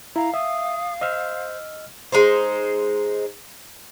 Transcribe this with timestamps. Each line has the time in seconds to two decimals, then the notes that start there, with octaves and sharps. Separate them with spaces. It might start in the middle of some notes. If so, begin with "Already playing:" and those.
0.16 E4 F5 A#5
0.34 E5 D#6
1.01 C5 D#5 E6 F6
2.12 G#3 D#4 C5